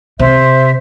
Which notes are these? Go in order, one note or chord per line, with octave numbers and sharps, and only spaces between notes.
C3 C5 E5